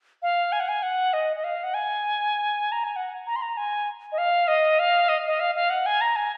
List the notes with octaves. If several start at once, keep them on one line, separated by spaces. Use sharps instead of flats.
F5
G#5
F#5
G#5
F#5
D#5
D#5
F5
F#5
G#5
A#5
G#5
F#5
A#5
C6
A#5
G#5
D#5
F5
D#5
F5
D#5
D#5
F5
F5
F#5
G#5
A#5
G#5